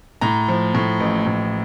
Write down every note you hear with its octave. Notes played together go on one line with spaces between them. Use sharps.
A2 A#5
F3
A2
A1
A2